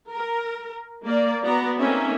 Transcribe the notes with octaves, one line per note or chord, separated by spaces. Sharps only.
A#4
A#3 D5
B3 F#4 D5 A#5
A3 A#3 C4 C#4 D#4 E5